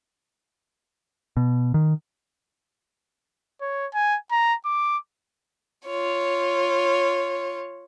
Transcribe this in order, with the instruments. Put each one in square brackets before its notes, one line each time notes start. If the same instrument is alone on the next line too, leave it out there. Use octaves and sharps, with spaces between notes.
[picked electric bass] B2
D#3
[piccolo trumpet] C#5
G#5
A#5
D6
[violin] F4 C#5